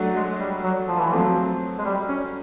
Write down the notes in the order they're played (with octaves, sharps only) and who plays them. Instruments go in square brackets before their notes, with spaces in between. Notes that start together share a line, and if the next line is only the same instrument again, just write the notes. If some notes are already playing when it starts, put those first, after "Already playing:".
Already playing: [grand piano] F#3 A3 D4 F#4
[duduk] G#3
G3
F#3
F3
E3
[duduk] F3 [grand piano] F#3 A3 C4
[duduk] G#3
G3
C#4